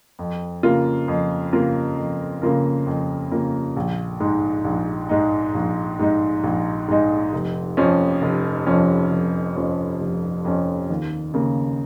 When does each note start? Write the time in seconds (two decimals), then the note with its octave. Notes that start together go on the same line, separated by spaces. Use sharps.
0.19 F2
0.63 C#3 A#3 F4 A#4
1.08 F2
1.53 C#3 A#3 F4 A#4
1.97 F2
2.42 C#3 A#3 F4 A#4
2.87 F2
3.31 C#3 A#3 F4 A#4
3.77 A#1
4.20 G#2 G#3 D#4
4.65 A#1
5.09 G#2 G#3 D#4
5.55 A#1
5.99 G#2 G#3 D#4
6.44 A#1
6.88 G#2 G#3 D#4
7.33 F1
7.77 F2 F3 C#4
8.22 F1
8.67 F2 F3 C#4
9.11 F1
9.56 F2 F3 C#4
10.01 F1
10.45 F2 F3 C#4
10.90 D#2
11.34 C#3 A#3